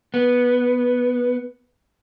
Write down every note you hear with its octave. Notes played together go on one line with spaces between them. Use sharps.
B3